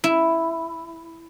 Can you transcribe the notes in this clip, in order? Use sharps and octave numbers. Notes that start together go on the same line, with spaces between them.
E4